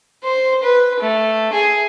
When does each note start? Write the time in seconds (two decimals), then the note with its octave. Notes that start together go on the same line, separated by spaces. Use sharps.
0.24 C5
0.63 B4
1.00 A3
1.53 G#4